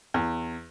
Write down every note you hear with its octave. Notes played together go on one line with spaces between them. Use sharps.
E2